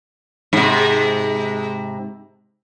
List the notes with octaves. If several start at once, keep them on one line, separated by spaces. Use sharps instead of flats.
G#2 C3